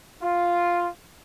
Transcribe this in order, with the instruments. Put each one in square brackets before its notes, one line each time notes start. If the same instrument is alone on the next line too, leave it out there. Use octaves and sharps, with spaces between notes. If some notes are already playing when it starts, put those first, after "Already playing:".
[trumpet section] F4